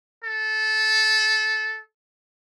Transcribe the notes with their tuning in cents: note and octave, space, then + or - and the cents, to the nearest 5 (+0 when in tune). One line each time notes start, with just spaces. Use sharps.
A4 -15